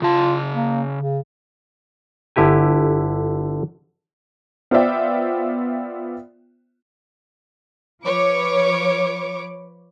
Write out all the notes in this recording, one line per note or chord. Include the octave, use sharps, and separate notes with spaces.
C#3 F4 A5
A#3
C#3
G1 D3 E4 G4 G#5
B3 F4 C5 D5 E5 G5
F3 B4 C#5 D6